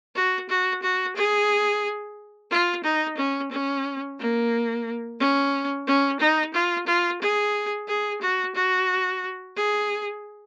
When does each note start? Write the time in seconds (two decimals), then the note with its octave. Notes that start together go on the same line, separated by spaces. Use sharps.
0.15 F#4
0.49 F#4
0.83 F#4
1.16 G#4
2.51 F4
2.83 D#4
3.17 C#4
3.51 C#4
4.19 A#3
5.20 C#4
5.87 C#4
6.20 D#4
6.54 F4
6.87 F4
7.21 G#4
7.88 G#4
8.21 F#4
8.55 F#4
9.57 G#4